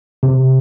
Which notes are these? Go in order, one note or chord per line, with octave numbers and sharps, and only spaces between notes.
C3